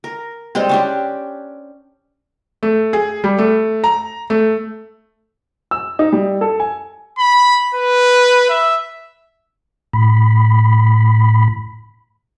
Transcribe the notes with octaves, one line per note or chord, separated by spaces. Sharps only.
A#4
G3 G#3 C4
C#4 D4 G4
A3
G#4
G3
A3
A#5
A3
E6
D#4
G3
A4
G#5
B5
B4
E5
A2 B5